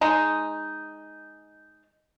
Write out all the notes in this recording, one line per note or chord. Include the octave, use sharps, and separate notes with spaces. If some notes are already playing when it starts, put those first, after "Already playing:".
G#3 D#4